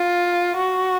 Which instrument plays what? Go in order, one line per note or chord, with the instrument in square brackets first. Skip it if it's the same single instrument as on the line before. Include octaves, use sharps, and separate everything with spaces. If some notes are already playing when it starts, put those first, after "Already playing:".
Already playing: [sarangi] F4
F#4